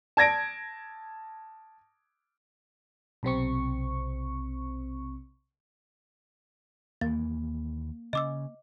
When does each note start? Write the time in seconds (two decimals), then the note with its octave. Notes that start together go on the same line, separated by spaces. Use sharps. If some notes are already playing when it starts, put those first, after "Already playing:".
0.17 A5 G#6 A#6 D7
3.23 B1 C3 C4 C#6
7.01 D#2 E3 A#3 A6
8.13 C#3 C#4 D#5 D6 E6